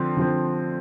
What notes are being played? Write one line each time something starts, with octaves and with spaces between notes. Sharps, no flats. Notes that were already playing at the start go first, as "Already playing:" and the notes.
Already playing: D3 F3 C4
D3 F3 C4